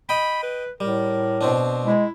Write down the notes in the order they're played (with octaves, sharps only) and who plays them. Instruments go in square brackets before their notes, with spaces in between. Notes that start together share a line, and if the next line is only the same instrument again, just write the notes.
[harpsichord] D#5 G5 [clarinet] B5
[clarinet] B4
[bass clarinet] A2 [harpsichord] G3 [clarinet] A#4
[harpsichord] B2 C4 D4
[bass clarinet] G#3 [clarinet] E4